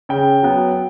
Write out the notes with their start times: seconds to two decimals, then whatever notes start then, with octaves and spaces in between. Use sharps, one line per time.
0.09 C#3 G5
0.43 F#3 B3